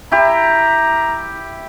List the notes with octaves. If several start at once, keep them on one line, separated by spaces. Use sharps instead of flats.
E4 G4 A#5